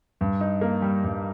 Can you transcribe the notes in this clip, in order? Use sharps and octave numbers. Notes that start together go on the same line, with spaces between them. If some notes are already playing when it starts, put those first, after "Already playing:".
G2
D#4
A#3
G3
G2